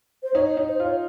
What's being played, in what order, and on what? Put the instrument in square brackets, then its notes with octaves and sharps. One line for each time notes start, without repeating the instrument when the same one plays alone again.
[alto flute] C5
[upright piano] D#4 [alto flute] C#5
[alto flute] C#5
[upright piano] D#4
[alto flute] C5
[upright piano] F4
[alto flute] C#5